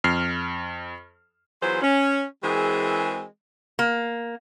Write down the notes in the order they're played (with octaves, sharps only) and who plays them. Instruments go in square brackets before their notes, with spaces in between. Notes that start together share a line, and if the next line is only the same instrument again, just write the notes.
[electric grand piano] F2 F6 C7
[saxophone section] E3 F#3 B3 F4 G#4 C5
C#4
E3 G#3 C4 F#4 G#4 A#4
[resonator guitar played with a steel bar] A#3